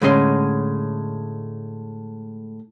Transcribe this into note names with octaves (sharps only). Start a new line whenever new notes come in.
A2 D3 G#3 C#4 D5 C6